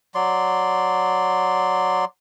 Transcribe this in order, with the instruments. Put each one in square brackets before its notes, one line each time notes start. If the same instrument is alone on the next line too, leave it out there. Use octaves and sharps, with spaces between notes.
[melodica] F#3 D5 C6